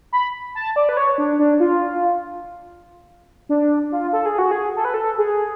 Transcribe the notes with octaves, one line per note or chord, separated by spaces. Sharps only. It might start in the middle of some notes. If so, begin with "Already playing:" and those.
B5
A5
D5
B4
C#5
D4
D4
F4
D4
F4
A4
G#4
F#4
G#4
A4
B4
A4
G#4